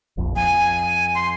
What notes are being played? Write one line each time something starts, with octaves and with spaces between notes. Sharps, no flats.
F1 A#1 F2
F2 G#5
C6